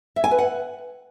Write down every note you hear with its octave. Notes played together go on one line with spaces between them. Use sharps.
E5
G#5
B4
F#5